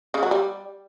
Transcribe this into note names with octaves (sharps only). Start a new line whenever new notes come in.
C#3
F#3
G3